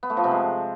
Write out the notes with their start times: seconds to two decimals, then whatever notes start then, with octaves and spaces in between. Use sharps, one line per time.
0.03 B3
0.10 A3
0.17 F3
0.24 C3
0.31 G#3